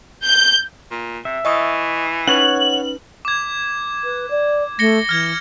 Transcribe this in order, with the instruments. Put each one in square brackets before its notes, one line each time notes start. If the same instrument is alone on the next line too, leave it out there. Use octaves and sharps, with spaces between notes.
[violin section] G6
[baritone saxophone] A#2
[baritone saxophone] C3 [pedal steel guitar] E5
[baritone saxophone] E3 [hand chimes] D#5 C#6 D#6
[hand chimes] C#4 D#4 B4 [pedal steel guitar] C#5 F#5 [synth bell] F#7
[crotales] D6 G#6
[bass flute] B4
D5
[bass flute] A3 [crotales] A#6 C#7 G7
[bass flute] E3 [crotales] F6 G#6